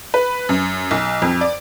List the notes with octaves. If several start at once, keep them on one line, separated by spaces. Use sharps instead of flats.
B4
F#2
B1
F2
D5